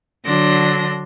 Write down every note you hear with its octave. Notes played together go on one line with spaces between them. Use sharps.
D3 F#3 D4 C6 A#6